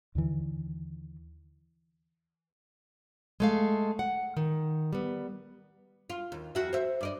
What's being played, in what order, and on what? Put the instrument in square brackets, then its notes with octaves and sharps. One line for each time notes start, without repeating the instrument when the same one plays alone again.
[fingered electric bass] D#2 D3 E3
[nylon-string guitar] G#3 A3 F5
F#5
D#3
G3 B3
[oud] F4
D#2
F2 F#4 E5
C5 E5
G2 D5 D#5